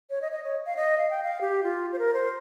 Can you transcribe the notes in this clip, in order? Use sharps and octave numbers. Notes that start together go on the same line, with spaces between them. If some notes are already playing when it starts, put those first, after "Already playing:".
C#5
D#5
D#5
C#5
F5
D#5
F5
G5
F5
G4
F4
C5
A#4
C5